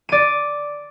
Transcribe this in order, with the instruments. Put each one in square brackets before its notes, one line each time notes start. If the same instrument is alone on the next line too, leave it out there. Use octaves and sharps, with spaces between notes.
[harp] D5 D#7